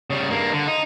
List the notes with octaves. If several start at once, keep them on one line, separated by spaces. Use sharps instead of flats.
C#3 G3
G2 A#3
D3
D#4